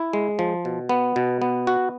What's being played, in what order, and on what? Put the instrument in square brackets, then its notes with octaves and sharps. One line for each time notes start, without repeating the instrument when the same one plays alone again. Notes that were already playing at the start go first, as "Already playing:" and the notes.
Already playing: [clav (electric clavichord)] E4
G#3
F3
B2
B3
B2
B3
F#4